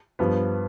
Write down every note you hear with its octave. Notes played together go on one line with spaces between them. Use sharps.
G2 F3 B3